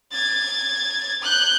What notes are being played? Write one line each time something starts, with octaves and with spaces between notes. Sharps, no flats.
G#6 A6
F#6 G6